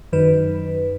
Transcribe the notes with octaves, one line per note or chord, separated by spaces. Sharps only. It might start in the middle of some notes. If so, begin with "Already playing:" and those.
F#2 D#3 B4